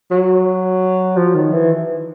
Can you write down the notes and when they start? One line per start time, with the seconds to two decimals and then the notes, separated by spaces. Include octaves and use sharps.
0.11 F#3
1.17 F3
1.35 D#3
1.52 E3